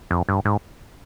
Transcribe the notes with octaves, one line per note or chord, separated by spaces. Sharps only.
F2
G2
G#2